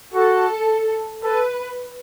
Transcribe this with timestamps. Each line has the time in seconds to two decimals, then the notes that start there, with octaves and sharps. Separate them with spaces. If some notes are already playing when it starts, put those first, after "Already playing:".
0.14 F#4 A4
1.24 A4 B4